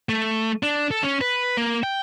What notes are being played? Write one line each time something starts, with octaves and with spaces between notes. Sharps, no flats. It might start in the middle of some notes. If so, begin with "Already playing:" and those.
A3
D4
A4
C#4
B4
A#3
G5